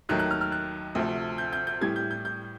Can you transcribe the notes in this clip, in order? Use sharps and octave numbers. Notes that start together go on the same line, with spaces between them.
D#2 D#3 F#3 A3 F#6
F#6
F6
F6
F#6
D2 C3 F3 A3
G6
G6
G6
A2 E3 G3 G#6
G6
G6
G6